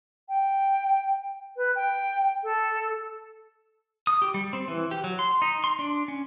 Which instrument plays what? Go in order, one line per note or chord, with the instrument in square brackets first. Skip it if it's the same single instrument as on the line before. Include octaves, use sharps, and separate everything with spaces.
[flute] G5
B4
G5
A4
[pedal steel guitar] D#6
G4
G3
C4
E3
G4
F#3
C6
D#4
C6
D4
C#4